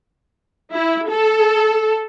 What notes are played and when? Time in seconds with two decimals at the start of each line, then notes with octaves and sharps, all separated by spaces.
0.72 E4
1.08 A4